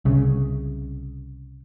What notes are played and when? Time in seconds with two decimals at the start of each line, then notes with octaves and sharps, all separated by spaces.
0.05 C2 C#3